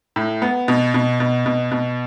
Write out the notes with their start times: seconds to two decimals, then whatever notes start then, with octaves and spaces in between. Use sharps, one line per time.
0.16 A2
0.42 B3
0.68 B2
0.94 B2
1.20 B2
1.46 B2
1.71 B2